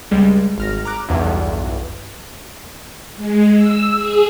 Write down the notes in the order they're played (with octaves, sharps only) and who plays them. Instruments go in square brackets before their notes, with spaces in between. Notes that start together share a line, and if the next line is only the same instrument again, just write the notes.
[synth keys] C#2 G3 G#3
G#1 F6 A#6
A#5 D6 F#6
B1 E2 G2
[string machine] G#3
E6
G#4